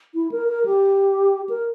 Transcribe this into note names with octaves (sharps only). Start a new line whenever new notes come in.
E4
A#4
A#4
G4
A#4